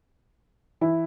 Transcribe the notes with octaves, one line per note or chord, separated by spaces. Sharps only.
E3 E4